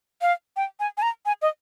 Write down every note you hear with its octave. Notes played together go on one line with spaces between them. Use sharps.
F5
G5
G#5
G#5
A#5
G#5
D#5